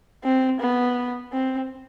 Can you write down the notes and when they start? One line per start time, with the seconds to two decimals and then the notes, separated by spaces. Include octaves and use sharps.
0.24 C4
0.60 B3
1.32 C4